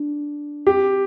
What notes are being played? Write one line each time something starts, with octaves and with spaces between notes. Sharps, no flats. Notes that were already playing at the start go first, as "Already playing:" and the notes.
Already playing: D4
C4 G4